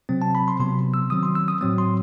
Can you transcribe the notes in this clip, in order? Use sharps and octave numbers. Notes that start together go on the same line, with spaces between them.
C3 F#3 C4
A5
B5
C6
C3 F#3 B3 C6
E6
D#3 F#3 C4 D#6
C6
E6
D#6
A2 F#3 C4 D#6
C6